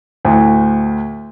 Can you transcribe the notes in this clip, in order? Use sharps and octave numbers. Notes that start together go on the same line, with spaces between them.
D2 A2